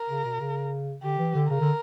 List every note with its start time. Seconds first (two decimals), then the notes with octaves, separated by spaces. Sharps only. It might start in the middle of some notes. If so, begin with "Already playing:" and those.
Already playing: A#4
0.10 C#3
0.25 B2
0.40 C#3
1.03 D3 G4
1.18 E3
1.35 D3
1.50 C#3 A#4
1.61 D3